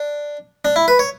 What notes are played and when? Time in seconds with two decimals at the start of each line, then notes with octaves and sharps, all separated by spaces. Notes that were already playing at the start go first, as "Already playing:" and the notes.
Already playing: D4
0.65 D4
0.76 E4
0.88 B4
0.99 C#5